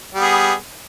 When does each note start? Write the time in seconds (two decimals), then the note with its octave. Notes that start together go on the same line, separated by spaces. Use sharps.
0.15 G3
0.19 B3
0.23 G#4